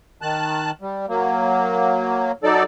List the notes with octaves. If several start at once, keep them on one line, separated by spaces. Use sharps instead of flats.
D#3 A5 F#6
G3
F#3 A#3
F#3 D#4 A4 D5